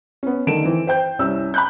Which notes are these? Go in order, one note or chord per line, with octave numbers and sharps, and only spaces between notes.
B3 C#4
D3 D#3 A3 D7 E7
E3 C4
C5 G5 G6
C2 C#4 E4 E6
B5 F#6 G6